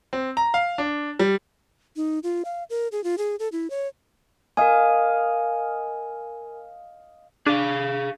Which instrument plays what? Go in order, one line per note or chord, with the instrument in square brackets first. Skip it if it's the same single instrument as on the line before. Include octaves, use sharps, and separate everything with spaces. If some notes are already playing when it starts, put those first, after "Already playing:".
[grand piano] C4
A#5
F5
D4
G3
[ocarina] D#4
F4
F5
A#4
G#4
F4
G#4
A4
E4
C#5
[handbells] A#4 G#5 [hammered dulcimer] D#5 F5
[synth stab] D4 [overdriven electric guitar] G#4 F5